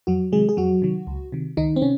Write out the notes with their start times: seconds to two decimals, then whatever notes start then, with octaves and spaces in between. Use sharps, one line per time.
0.07 F2 F#3 F#4
0.32 C3 D#3 F#3 G#3 G#4
0.49 G#4
0.57 F2 F#3 F#4
0.82 C3 D#3 F#3
1.07 C#2
1.32 C3 D#3
1.57 C#2 D#3 D#4
1.76 C4
1.82 C3 C#4